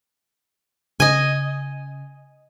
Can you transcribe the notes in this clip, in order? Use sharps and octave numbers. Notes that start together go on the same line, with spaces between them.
C#3 D#5 G#5